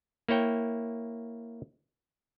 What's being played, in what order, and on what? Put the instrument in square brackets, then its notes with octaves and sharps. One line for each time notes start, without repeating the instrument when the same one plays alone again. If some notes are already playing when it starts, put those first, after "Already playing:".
[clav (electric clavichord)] A#3 E4 C#5 G5